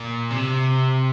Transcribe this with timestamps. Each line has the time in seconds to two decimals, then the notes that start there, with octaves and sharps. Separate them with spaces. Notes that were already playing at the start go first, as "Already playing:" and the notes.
Already playing: A#2
0.30 C3